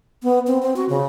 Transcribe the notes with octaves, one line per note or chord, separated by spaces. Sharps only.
B3
C4
C4
F#4
C#3